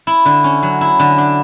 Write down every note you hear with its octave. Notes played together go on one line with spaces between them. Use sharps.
E4
D3
C#4
F#3
E4
D3
D4